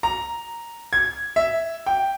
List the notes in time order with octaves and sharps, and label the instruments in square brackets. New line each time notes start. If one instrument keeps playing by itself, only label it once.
[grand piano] A#5
G#6
E5
G5